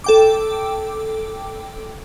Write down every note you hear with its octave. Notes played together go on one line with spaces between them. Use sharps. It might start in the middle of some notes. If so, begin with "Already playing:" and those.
A4 G5 D6